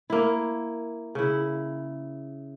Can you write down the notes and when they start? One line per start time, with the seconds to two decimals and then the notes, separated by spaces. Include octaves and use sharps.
0.10 A#3 E4
1.15 C#3 E4